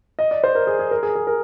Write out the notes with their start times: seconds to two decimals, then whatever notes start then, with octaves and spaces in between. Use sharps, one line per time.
0.19 D#5
0.31 D5
0.44 C5
0.55 A#4
0.67 G#4
0.79 G#4
0.91 A#4
1.03 G#4
1.15 G#4
1.27 A#4